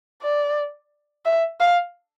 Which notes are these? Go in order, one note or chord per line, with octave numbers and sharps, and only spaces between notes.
D5
E5
F5